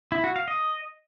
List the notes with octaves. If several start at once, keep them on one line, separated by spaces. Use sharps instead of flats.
E4
F#4
F5
D#5